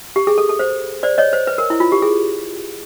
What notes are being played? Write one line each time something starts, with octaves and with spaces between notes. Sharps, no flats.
G4
G#4
A4
A4
C5
C5 D5
C#5 D#5
C5
B4
A#4
E4
F4
G4
G#4